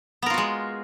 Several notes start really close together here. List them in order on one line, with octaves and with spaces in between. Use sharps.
B3 A#4 F4 F#4 G#3